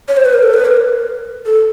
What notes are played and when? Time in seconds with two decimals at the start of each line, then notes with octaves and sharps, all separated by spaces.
0.08 C#5
0.17 C5
0.25 B4
0.34 A#4
0.43 A4
0.54 B4
0.66 A#4
1.46 A4